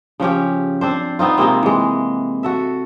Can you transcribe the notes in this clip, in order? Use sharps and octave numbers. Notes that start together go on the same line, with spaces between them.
C#3 F3 C#4 G4
C4 D4 C5
B3 C4 D#4 F4
C3 G#3 A#3 C4
E3 G#3
F#4 A4 E5